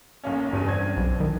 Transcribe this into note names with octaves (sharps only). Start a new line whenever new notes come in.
B1 A#3 C#4
F#1 E2 G2 D#7
C4 D4 G#6
B1
D#3